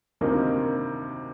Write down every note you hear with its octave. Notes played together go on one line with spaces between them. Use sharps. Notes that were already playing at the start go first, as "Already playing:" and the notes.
D2 C3 D#3 A#3 D#4